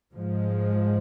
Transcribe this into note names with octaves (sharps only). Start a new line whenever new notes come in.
G#2 F3 G#3